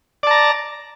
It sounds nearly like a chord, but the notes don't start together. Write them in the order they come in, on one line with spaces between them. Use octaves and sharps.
D5 A5 A#5